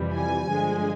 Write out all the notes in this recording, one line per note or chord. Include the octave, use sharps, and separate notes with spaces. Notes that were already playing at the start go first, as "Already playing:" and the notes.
Already playing: F2 C3 E3 G3
G#5
G2 D3 F3 G#3